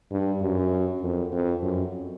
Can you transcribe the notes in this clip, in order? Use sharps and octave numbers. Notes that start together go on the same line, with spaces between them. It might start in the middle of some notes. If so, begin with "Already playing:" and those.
G2
F#2
F2
F2
F#2